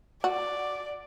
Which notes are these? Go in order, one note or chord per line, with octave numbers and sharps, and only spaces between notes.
F#4 D5